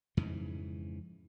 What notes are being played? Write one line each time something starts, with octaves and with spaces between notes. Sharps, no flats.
F2 G#2 C#3 E3